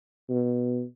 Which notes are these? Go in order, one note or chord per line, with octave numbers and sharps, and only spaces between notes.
B2